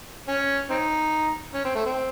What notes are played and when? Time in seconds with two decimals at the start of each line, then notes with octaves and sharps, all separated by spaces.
0.28 C#4
0.70 C4 D#4
1.54 C#4
1.64 C4
1.75 A3
1.86 C4